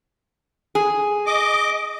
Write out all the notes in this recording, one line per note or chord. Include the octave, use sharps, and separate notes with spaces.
G#4
D#5 D6